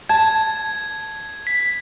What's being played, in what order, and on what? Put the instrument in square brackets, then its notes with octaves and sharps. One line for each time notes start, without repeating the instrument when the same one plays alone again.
[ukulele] A5 [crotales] G#6
[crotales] B6